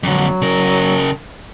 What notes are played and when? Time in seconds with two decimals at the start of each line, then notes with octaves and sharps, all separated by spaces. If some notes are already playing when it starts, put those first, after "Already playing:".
0.03 F2 D3 F#3
0.42 C#3 A#4